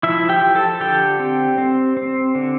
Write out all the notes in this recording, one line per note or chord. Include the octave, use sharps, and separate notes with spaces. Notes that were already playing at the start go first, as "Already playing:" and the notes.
F3 E4 E5
G4 G5
F3
A4 A5
D3 G4 G5
C4
C4
C4
D3